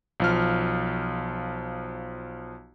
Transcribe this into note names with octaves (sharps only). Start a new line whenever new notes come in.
B1 F3 F6